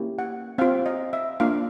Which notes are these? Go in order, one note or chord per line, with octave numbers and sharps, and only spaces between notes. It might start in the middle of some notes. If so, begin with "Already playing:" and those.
Already playing: A#3 C#4 E4 G4
F#5
C4 F4 F5
D#5
E5
A#3 D4 F4 F5